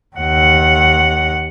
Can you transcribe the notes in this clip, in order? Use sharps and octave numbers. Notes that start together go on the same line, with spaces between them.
D#2 F#5